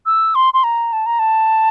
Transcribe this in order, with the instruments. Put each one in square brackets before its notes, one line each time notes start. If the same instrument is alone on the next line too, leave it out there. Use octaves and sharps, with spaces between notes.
[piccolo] E6
C6
C6
A#5
A5
A#5
A5